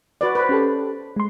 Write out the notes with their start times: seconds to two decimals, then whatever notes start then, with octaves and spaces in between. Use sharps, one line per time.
0.21 F#4 B4 D5
0.35 B4 C5
0.49 C#4 G4 A4
1.16 G#3 C6